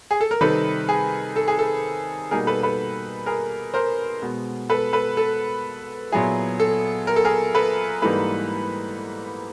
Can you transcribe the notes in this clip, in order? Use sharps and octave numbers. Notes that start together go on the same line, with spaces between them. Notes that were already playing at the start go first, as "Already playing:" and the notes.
G#4
A4
A#4
C3 D#3 G3 C4 D#4 A4 B4
G#4
A4
G#4
A4
B2 G3 A#3 D#4 G#4 A#4
A4 B4
A4 B4
G#4 A#4
A#4 C5
B2 G#3 B3
A4 B4
A4 B4
A4
A#2 F#3 B3 E4 G#4
A4
A#4
A4
G#4 A#4
A4 B4
G#2 E3 G3 A#3 D#4 A4 B4